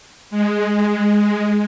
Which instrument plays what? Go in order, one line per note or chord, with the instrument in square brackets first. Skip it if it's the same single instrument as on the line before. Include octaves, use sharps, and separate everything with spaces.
[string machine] G#3